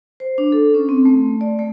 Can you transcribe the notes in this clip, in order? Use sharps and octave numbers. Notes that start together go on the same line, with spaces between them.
C5
D4
A4
C#4
C4
A3
D5
A3